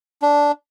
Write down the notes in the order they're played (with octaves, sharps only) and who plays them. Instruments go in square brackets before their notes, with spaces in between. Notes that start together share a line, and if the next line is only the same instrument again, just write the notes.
[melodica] D4